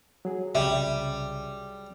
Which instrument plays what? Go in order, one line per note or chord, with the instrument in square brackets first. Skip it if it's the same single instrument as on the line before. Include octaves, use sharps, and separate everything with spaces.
[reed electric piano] F#3 G#4
[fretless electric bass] C2 C#3 [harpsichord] G3 [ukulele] E5